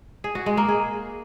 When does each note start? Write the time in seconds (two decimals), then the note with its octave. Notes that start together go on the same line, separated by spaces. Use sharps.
0.24 G#4
0.35 F#4
0.46 G#3
0.57 A#3
0.68 G#4